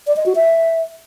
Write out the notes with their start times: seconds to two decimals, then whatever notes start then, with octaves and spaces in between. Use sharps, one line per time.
0.07 D5
0.17 D#5
0.26 F#4
0.35 E5